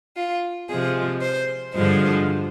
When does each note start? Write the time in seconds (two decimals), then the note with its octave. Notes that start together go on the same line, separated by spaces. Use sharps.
0.16 F4
0.69 C3 F3 G#3 G#4
1.22 C5
1.74 G2 D3 F3 G#3 C5